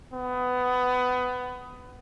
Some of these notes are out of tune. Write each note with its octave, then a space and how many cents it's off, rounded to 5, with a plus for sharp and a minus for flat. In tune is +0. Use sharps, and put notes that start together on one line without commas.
B3 +20